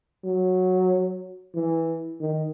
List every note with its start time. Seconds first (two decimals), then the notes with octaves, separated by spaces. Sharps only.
0.25 F#3
1.55 E3
2.21 D#3